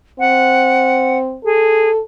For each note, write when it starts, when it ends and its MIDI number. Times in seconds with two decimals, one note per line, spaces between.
0.20 1.38 60
0.20 1.18 78
1.44 1.90 68
1.44 2.01 69